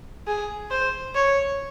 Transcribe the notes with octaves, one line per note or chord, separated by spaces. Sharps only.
G#4
C5
C#5